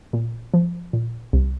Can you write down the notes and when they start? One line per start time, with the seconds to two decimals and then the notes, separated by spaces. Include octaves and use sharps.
0.13 A#2
0.54 F3
0.93 A#2
1.33 C2